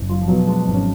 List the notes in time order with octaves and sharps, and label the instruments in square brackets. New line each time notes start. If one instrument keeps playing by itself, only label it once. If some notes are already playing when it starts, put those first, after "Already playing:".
Already playing: [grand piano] F#1
[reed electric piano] F#3 [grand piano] F4
[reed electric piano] F3
[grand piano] B2 [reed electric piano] F#3
[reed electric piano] G#3 [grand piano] D4
[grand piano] G#1
[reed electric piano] C#4